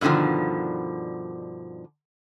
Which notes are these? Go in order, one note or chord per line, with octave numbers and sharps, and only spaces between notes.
G2 B2 D3 D#3 F3